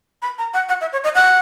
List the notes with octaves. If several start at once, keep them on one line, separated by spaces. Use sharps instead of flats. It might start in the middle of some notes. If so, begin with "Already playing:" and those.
B5
A#5
F#5
F#5
E5
C#5
D#5
F#5